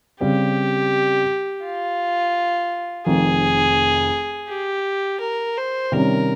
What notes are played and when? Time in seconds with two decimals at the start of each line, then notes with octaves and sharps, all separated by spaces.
0.21 C#3 G3 C4 G4
1.64 F4
3.06 F1 F2 D#3 G#4
4.49 G4
5.20 A#4
5.57 C5
5.92 C3 D#3 G3 C#4 A#4